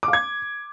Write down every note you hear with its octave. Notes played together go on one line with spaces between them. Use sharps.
D6
F5
G#6